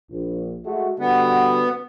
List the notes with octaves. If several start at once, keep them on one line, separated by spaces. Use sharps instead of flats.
A#1
G#3 A3 F#4
D3 G3 B3 F#4